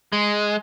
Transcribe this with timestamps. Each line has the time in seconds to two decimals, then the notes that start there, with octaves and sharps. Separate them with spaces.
0.13 G#3